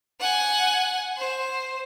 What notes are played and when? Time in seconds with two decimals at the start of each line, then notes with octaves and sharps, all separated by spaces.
0.20 F#5 G#5
1.18 C5